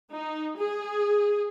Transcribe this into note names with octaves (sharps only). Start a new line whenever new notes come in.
D#4
G#4